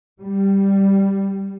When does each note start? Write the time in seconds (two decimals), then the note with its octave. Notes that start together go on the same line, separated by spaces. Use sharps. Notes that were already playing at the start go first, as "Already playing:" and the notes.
0.21 G3